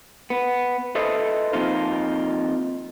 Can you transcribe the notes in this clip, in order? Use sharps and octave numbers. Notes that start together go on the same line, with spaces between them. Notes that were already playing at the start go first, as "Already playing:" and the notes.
B3
A4 B4 C5 D#5 E5
F2 D#3 A#3 F4